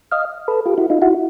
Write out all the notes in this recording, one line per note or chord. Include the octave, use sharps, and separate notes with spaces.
D#5 F5
A4 B4
F4 G4
E4 F#4
D#4 F4
E4 F#4